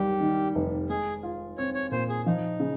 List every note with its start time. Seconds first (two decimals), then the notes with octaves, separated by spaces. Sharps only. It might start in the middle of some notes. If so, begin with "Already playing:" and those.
Already playing: D#2 G3 G4
0.20 D#3
0.55 F1
0.89 G#3 G#4
1.23 F4
1.58 C4 C#5
1.75 C#5
1.92 A#2 C5
2.09 G#4
2.26 F3 D#4
2.60 C#3